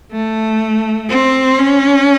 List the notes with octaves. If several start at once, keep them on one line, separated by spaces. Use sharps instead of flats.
A3
C4
C#4